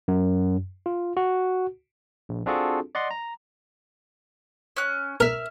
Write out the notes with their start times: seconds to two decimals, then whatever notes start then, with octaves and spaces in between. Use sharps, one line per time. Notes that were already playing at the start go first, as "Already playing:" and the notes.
0.08 F#2
0.86 F4
1.17 F#4
2.29 A#1
2.46 C4 D4 F4 F#4 G#4 A4
2.95 D5 D#5 F#5 C6
3.11 A#5
4.77 C#4 F#6
5.20 A#4 E5 F6